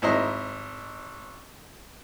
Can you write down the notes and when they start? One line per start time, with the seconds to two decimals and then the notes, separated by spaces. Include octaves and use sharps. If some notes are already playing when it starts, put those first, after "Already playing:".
0.02 G#1 E4 C5 D#5 A#5 C6